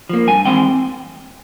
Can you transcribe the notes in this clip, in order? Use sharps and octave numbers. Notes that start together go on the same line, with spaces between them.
F3 A#3
G2 G#5
E3 G#3 C4 G5